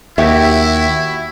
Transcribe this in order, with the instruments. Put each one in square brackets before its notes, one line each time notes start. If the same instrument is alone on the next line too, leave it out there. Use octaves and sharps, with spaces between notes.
[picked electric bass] D#2 [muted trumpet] E4 [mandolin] F#4 G4 C#5 [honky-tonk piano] E5